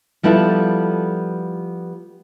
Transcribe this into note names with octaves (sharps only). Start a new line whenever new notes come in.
F3 G3 B3 E4 F4 A4